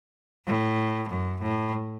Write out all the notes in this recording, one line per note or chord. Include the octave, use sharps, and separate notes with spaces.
A2
F#2
A2